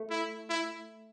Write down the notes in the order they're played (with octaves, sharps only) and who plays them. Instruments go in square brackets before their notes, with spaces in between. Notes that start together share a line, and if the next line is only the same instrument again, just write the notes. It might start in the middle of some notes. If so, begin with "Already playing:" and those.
Already playing: [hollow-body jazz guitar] A3
[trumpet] E4
E4